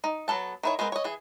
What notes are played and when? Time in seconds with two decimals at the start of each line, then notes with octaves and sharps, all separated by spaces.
0.04 D#4
0.28 F#3 B3 A4 A5
0.63 D#3 E4 C#5
0.79 G#3 B3 C4 E4 A#4
0.92 C#5 D#5
1.04 E3 G#4